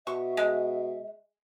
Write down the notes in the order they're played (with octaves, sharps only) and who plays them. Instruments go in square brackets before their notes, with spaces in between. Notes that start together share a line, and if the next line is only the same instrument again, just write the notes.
[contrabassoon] B2 [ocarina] E5 [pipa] C#6
[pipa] G#3